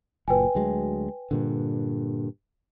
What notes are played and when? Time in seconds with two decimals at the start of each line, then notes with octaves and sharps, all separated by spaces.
0.28 F#1 A#2 B4 G5 G#5
0.55 D2 F#3 G#3
1.31 G2 A#2 D3